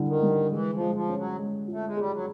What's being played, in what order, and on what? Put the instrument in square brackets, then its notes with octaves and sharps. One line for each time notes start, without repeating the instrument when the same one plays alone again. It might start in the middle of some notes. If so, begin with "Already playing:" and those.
Already playing: [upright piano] D3 G3 E4
[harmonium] D#3
[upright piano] G3
[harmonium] E3 [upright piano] G#3
[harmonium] F3
[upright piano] G#3
[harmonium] F3
[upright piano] C#4
[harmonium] F#3
[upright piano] G#3
[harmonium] A3 [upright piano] F4
[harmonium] G#3
[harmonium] G3 [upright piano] G#4
[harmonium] F#3